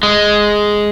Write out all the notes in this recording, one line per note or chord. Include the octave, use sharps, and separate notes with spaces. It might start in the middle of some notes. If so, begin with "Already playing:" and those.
G#3